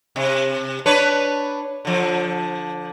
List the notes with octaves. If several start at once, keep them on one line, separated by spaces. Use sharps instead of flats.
C3
D4 B4 C#5
D3 F3